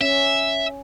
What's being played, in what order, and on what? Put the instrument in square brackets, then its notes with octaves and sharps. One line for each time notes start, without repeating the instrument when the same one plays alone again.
[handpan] C#4 [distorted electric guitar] E5